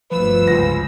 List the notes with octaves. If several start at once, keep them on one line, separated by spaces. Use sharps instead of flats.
G1 D2 F3 B4 E6
C#2 A#6